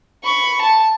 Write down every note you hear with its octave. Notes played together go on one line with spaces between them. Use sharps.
B5 C#6
A5